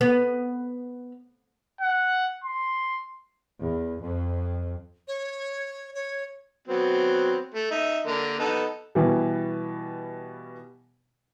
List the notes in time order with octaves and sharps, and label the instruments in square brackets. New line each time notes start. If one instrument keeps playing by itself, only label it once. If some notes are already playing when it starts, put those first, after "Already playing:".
[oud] B3
[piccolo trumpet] F#5
C6
[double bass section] E2
F2
[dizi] C#5
C#5
[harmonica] F#3 B3 C4
A3
D#4 E5
D3 A#3 A#4
B3 D#4 A4
[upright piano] B2 E3 G3